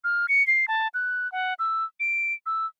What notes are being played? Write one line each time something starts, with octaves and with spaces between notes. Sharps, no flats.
F6
C#7
C7
A5
F#6
F#5
E6
D7
E6